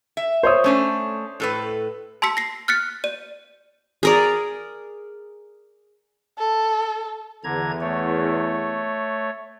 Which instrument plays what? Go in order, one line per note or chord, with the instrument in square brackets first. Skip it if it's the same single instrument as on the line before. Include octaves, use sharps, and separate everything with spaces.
[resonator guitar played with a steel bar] E5
[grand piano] C5 C#5 D#6
[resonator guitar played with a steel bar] A3 C#4 D4
A2 A4 B4
[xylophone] A5 C6 E6 B6 C#7
A#6 C7
F6 F#6 A6 B6 C#7
D5 D#7
[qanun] G#4 A#4 D5
[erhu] A4
[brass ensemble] E2 [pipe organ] D3 A#5 G#6
[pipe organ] A3 C#5